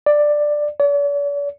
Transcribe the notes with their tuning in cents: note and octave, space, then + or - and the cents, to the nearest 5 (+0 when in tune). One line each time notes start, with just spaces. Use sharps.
D5 +10
D5 -45